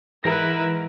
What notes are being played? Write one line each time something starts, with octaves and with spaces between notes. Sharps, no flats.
G#2 E3 E4 A#4 B4 A#6